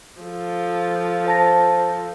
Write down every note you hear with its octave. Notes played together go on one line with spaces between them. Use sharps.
F3 A4
C5 A5 A#6